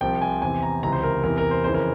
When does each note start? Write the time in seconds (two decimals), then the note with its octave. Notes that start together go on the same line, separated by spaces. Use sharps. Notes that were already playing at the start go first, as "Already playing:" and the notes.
0.01 C2 C3 F3 G5
0.22 G#5
0.42 E2 C3 E3 G#5
0.62 A#5
0.83 C#2 C3 E3 A#5
0.92 C5
1.03 A#4
1.24 E2 C3 E3 A#4
1.38 A#4
1.51 C5
1.64 F2 C#3 E3 C5
1.74 A#4